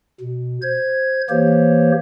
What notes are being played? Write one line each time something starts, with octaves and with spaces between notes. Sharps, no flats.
B2
C5 G#6
E3 A#3 G4 C5 C#5